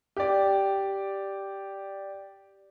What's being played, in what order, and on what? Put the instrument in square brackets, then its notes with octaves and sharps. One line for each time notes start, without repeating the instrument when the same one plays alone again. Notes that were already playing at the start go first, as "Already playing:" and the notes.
[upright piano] G4 D5